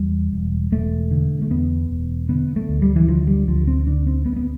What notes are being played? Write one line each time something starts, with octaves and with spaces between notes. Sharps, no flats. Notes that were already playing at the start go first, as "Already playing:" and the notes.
Already playing: E2 G3
E1
E1 A3
D3
A3
E2 B3
E1
D3 B3
A3
D2
G3
E3
D3 F3
G3
D2 F3
C4
D3 D4
C4
D2 B3
B3